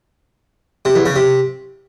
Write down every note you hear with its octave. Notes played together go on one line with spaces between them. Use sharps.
C3
E2
C#3
C3